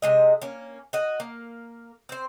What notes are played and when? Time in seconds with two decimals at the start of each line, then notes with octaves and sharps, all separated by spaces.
0.02 C3 G#3 D#5
0.42 A#3 C#4
0.93 F#4 D#5
1.20 A#3
2.09 C4 C5